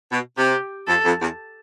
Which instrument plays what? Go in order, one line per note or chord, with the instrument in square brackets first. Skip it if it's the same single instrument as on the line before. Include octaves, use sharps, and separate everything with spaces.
[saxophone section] B2
[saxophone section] C3 [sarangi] G4
[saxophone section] F2 [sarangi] A4
[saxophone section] F2
E2